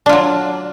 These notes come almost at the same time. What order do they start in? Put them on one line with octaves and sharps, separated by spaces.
D4 F4 F#3